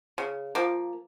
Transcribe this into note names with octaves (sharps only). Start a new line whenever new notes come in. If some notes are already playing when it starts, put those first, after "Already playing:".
C#3
F3 A#3